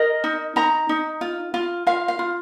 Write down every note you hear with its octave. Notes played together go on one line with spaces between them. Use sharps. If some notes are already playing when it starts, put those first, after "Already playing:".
Already playing: A#4 D#5
D#4
D#4 A#5
D#4
F4
F4
F4 F5
F5
F4